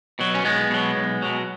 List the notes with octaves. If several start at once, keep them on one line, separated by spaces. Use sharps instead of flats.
B2 F#3
C#4
B1 G#3 B3
B2 F#3
B1
B2 F#3